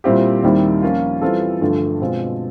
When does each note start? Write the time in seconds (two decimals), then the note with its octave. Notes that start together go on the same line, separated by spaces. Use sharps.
0.04 A#2 G3 C4 E4 G4
0.43 D#2 D#3 G3 C4 E4
0.82 F3 A#3 C#4 F4
1.21 E3 G3 C4 F4 A4
1.61 G2 D3 F3 A3
2.00 B2 G#3 C4 F4